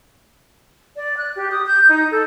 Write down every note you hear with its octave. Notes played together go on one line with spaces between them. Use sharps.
D5
F#6
G4
D#6
G6
D#4
A4